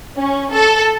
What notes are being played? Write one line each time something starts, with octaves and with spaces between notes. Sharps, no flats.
C#4
A4